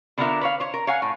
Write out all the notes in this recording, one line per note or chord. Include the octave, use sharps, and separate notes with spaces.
D3 B3 D4 F4 A#4 E5
B4 C#5 F5
C5 C#5
A#4
C#5 F5 F#5 G#5
A2